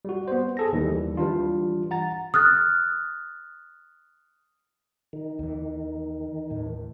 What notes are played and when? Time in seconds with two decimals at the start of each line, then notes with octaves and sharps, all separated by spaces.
0.05 G3 F#4
0.28 B3 C5
0.57 G#4 A4 A#6
0.73 D#2 D#3 E3 G3
1.17 E3 G3 D4 F4
1.91 F#5 A#5 A6
2.34 D#6 F6 F#6 A6
5.13 D#3
5.39 D#2 E3
6.50 D#2 A2